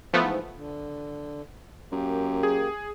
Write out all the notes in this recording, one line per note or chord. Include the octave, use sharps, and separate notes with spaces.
G#2 E3 F3 A3 B3
D3
F#2 A#3 G4
G#4